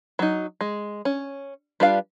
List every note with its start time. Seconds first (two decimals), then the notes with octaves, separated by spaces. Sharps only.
0.19 F#3 D#4
0.61 G#3
1.05 C#4
1.80 G3 D4 F4 B4 F5